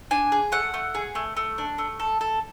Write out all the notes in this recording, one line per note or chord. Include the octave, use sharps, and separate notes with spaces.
D4 G#5
G#4
A3 F#5
A3
G#4
A3
A3
D4
A3
A4
A4